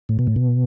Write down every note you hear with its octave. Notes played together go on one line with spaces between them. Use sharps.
A2
B2
A2
B2